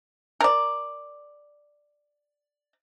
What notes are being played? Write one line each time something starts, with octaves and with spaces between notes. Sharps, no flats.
A#4 D5